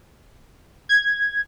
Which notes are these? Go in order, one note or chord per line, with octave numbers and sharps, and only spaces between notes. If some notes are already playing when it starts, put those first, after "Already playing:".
G#6